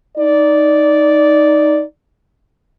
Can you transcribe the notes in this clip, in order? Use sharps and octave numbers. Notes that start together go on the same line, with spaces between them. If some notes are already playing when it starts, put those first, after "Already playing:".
D#4 D5